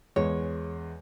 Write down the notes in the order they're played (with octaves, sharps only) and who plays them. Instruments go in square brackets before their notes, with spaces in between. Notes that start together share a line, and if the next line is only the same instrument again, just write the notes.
[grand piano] E2 G#3 [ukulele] C#5